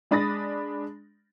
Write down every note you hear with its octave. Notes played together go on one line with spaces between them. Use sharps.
G#3 D4 B5 D#6 A6 A#6